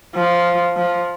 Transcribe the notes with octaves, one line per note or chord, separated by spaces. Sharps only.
F3
F3